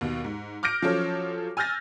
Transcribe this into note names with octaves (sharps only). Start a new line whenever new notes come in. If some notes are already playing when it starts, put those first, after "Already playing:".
D#2 B2
G#2
D6 F6 G6 A#6 D7
F3 F#3 C#4 F4 A4 C#5
G#5 E6 F6 G6 A6 A#6